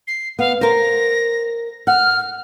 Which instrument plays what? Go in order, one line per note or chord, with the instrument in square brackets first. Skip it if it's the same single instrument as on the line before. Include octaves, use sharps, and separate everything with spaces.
[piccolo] C7
[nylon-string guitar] B3 [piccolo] F5
[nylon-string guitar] A#4 C5 [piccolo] A#6
[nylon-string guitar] F#5 [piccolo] F6